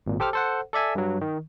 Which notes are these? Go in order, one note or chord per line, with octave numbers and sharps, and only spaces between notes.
G#1 A#2
G4 A4 C5 G5 D6 F6
A4 C5 F#5
A4 D5 E5 G#5
G2 F#3
D#3